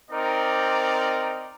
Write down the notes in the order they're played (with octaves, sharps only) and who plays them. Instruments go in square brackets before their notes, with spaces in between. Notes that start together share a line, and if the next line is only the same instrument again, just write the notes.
[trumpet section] C4 D#4 A#4 D5